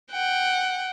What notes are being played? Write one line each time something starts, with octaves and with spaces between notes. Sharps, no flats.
F#5 G5